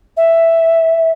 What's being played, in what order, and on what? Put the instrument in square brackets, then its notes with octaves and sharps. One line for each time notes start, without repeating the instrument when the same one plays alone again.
[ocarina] E5